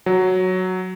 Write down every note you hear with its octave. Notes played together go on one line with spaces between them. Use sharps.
F#3